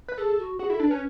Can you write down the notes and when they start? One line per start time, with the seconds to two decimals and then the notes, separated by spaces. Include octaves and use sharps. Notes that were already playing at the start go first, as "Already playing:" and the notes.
0.08 B4
0.18 G#4 A4
0.39 F#4
0.59 F#4 G#4
0.70 E4 A4
0.80 D4
0.88 C#4 B4